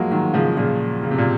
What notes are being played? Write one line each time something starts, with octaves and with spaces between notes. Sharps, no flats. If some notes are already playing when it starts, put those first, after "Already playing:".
Already playing: F3 F#3 G#3 A#3
D#3 F#3
C#3 F3
A#2 C#3
C#3
C3
A#2